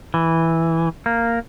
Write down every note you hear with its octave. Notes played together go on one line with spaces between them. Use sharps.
E3
A#3